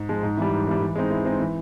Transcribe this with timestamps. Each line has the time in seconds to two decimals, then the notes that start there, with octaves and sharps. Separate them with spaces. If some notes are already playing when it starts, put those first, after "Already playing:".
Already playing: G#2
0.09 F3 G#3
0.23 G#2
0.37 E3 G3
0.53 G#2
0.67 E3 G3
0.82 E3
0.95 G#3 C4 D#4
1.10 E3
1.25 G#3 C4 D#4
1.40 E3